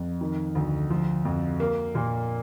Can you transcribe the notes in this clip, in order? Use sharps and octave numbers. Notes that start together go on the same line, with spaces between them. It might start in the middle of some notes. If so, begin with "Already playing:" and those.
Already playing: F2
D#3
D2
F3
F2
A#3
A#2